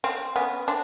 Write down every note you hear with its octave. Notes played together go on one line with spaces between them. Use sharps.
C4
B3 C#4
C4 D4